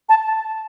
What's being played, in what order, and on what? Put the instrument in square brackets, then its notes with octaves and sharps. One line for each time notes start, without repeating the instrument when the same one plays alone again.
[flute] A5